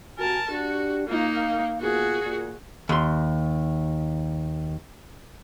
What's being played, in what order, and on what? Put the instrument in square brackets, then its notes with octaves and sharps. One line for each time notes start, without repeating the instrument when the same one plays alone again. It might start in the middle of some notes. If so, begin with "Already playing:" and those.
[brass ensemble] C3 F#4 G#5 [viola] A#4 A5
[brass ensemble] D4 G4 [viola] F#4
[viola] A#3 D#4 [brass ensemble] F4
[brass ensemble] F5
[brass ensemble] B2 A#3 F4 [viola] F#4 G#4
[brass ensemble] A#2
[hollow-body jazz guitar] D#2 C6